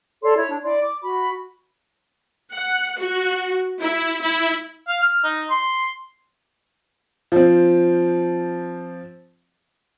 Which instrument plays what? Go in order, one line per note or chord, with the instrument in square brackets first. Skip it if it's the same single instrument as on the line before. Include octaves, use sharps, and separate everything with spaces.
[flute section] A4 C#5 D5 C6
E4 C#5 G#6
D4
E4 D5 C6
D6
F#4 B5
[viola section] F#5
F#4
E4
E4
[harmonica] F5
F6
D#4
C6
[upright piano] F3 C4